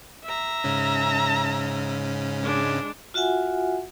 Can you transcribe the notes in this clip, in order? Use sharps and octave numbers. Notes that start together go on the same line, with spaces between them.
E5 A#5
G#2 C#3 C#4
G#3 D4
F4 F#4 E5 F#5 G#5